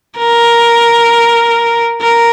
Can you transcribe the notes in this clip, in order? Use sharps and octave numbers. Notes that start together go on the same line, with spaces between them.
A#4
A#4